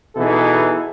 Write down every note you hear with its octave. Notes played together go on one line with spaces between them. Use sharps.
B2 E3 D#4 E4 G#4 A4